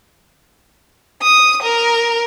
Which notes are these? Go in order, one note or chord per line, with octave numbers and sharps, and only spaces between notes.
D#6
A#4